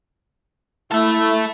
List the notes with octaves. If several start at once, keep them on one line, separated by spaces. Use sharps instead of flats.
A3 E4 A4 E5